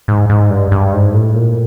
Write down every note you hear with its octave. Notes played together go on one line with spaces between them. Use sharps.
G#2
G#2
G2
G2
G#2
A2
A#2